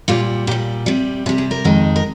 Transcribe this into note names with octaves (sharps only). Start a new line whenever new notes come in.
A#2 G3 F4
A#2 G3 G4
C3 G3
C3 G3 G#4
G#4
A#4
F2 D#3 G#3
A#4